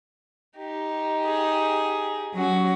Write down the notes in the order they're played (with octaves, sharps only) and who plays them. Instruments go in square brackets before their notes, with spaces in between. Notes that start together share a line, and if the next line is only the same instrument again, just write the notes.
[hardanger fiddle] D#4 G4
[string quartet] G#4
F#3 C#4 F#4